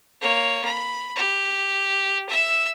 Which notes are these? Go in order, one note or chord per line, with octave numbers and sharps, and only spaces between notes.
A#3 C#5
B5
G4
E5 E6